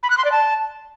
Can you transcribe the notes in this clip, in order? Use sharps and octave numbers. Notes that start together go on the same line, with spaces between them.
B5
F#6
C6
D5
A5